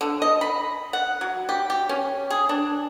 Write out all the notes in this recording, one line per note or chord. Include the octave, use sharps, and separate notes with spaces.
D3
D#5
B5
F#5
F#3
G4
G4
C#4
G#4
D4